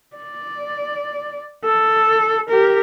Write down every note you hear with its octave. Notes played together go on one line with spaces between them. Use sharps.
D5
A4
G4 A#4